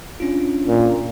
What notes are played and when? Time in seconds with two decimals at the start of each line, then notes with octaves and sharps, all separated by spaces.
0.20 C#4 D4 F4
0.68 A#2